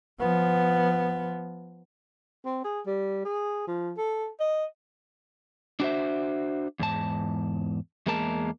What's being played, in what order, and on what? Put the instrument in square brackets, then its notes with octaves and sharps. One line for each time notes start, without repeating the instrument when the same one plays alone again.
[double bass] F3 B3
[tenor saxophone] C4
G#4
G3
G#4
F3
A4
D#5
[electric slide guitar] D4 F#4 C5 E5
E2 G#2 A5
E2 G#3 A#3 A#4 A5